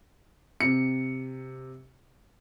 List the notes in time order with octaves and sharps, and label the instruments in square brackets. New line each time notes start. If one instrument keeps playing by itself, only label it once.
[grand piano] C3 C#7